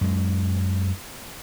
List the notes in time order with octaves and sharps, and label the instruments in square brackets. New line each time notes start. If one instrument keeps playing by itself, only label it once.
[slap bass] F#2 G#3